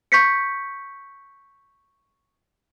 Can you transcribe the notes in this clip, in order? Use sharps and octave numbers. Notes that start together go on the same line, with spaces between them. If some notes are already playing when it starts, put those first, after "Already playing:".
C#6 G6 B6 C#7